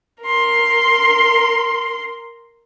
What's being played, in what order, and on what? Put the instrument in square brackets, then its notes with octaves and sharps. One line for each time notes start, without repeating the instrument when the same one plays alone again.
[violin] A#4 C6